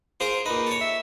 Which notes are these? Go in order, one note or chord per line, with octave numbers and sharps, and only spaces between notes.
F4 G#4 A#4 C5
A#2 D#4 B4
A4 C#5
E5